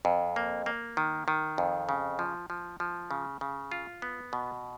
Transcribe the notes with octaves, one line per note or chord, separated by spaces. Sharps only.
F2
A#3
A#3
D#3
D#3
F2
C#3
F3
F3
F3
C#3
C#3
F4
B3
B2